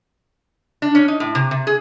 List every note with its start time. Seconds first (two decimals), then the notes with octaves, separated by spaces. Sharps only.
0.82 D4
0.95 C#4
1.08 D#4
1.20 A2
1.35 C3
1.51 C3
1.67 G#4